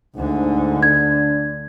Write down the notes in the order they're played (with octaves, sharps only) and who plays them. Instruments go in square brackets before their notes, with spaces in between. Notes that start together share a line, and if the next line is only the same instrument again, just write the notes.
[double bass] D2 D3 [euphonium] G#2
[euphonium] D4 [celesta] G#6